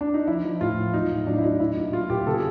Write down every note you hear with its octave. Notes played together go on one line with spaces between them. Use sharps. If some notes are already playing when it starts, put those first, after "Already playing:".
D4
D#4
F3 E4
F3
A2 F4
F3
F#3 D#4
A2
F#3 D4
E4
F#3 D#4
A#2 E4
A#2
F#3 F4
A#2 G4
C#3 A4
G#4